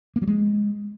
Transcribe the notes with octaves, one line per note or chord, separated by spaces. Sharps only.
A#3
F#3
G#3